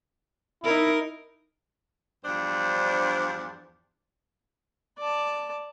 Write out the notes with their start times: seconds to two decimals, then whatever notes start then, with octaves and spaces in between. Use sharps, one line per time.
0.64 D#4 E4 A#4
2.24 E2 G2 F3 D4 C5 D5
4.99 D5 A5